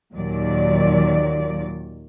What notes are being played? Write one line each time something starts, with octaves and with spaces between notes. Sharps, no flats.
D#2 A#2 D#3 F#3 D5